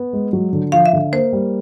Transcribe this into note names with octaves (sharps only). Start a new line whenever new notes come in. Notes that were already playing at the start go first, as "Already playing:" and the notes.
Already playing: B3
G#3
F#3
D3
F3 F5
E5
D3
A#3 C5
G3